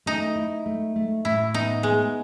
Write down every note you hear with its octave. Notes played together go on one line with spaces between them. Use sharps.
A3 D#4
E4
A3
A3
A2 E4
B3 D#4
G#3 B3